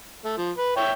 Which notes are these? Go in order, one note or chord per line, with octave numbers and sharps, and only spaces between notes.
A3
F3
B4
C#5 E5 G5